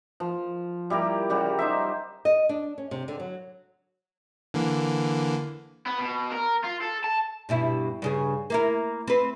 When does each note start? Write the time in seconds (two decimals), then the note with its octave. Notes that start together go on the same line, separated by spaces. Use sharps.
0.20 F3
0.90 G3 E4 G4 A#4
1.30 C#3 G3 G4 F#5
1.59 D#4 C5 E5
2.25 D#5
2.49 D4
2.78 C#4
2.91 C3
3.08 D3
3.20 F#3
4.54 D3 E3 A#3
5.86 B3
5.98 B2
6.31 A#4
6.64 F4
6.82 A4
7.04 A5
7.49 G2 B2 E4
8.02 G2 C#3 G#4
8.50 A#3 E4 A#4
9.07 C4 B4